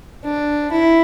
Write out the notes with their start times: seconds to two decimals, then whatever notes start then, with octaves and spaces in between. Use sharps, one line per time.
0.24 D4
0.71 E4